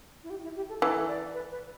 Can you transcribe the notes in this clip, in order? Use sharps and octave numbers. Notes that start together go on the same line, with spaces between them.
E4
G4
E4
G4
A4
E3 A4
D5
B4
B4